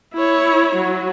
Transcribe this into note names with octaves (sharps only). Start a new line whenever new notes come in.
E4 C#5
F#3